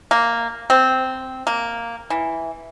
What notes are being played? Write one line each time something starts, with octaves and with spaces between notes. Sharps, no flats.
A#3
C4
A#3
E3